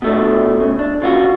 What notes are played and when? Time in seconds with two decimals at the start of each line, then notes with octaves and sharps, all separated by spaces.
0.02 B2 A3 D4
0.60 C#3
0.79 D4
1.02 C#3 F4 F#4